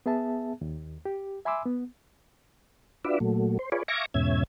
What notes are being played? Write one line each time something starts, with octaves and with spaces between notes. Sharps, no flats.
B3 G#4 E5 A5
D#2
G4
E5 G#5 B5 C6 D6 E6
B3
D4 F4 F#4 B4 D5 E5
A#2 F#3 A3
C5
F4 G#4 B4 C#5 D5
E5 F5 G#5 C#6 D6 A#6
E2 G#2 B2 C#4 E5 G#6